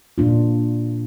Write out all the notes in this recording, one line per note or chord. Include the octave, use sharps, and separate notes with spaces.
A#2 A#3 D4 F4